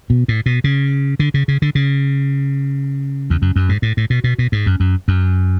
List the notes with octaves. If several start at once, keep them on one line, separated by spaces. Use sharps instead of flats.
B2
A2
B2
C#3
D3
C#3
C#3
D3
C#3
E2
F#2
F#2
G#2
A2
A2
B2
B2
B2
G#2
F#2
F#2
F#2